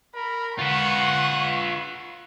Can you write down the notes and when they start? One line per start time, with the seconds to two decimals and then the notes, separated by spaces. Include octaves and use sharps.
0.15 A#4 B5
0.59 F4 B4 F#5 C#6